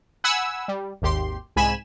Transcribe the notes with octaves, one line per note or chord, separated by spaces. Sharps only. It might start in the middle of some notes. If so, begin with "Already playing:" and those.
F#5 G#5 B5 E6
G3
G#1 D#2 G4 C6
C2 G#2 G#5 B5 E7